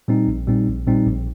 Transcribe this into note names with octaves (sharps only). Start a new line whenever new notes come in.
A#2 G3 C4 D#4
A#1
A#2 G3 C4 D#4
A#1
A#2 G3 C4 D#4
A#1